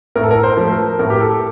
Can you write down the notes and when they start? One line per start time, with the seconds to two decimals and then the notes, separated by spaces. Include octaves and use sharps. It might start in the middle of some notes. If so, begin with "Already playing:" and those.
0.16 A2 A#4
0.23 A4
0.31 A#4
0.43 C5
0.57 F3 A3
0.71 A#4
0.99 A2 A#4
1.10 G4
1.21 A4